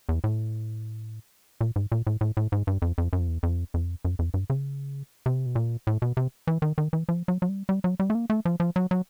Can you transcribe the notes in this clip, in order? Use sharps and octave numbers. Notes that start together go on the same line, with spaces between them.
E2
A2
A#2
G#2
A#2
A2
A2
A2
G#2
G2
F2
F2
F#2
F2
E2
F2
F2
F#2
F2
G2
C#3
C3
B2
A#2
A2
B2
C3
E3
D#3
D#3
E3
F3
F#3
F#3
G3
G3
F#3
G3
A3
A#3
A3
F3
F3
F#3
F#3